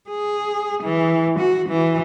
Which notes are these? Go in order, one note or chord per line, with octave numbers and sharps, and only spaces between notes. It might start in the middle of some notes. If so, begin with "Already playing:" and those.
G#4
E3
F#4
E3